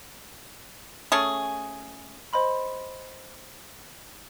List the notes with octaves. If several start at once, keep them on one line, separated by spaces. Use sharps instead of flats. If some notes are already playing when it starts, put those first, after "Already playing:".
A3 C#4 G#4
C5 D#5 B5 C6